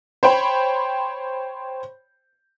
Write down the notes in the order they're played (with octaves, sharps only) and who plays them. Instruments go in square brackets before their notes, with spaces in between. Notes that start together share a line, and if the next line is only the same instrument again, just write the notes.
[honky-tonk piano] C5 C#5 G5 B5